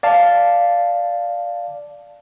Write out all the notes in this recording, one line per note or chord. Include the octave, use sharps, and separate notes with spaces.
D5 F5 A5